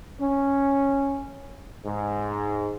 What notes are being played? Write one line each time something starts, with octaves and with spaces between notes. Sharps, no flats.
C#4
G#2